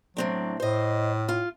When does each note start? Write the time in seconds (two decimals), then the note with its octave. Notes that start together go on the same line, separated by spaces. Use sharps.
0.17 A2 F#3 C4 D4
0.60 A2 C5 D#5
1.29 F4